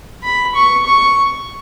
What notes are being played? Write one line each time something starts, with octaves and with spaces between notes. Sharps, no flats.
B5
C#6
C#6